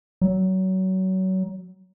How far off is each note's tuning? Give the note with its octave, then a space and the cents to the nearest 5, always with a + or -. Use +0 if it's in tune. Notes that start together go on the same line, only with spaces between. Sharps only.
F#3 +25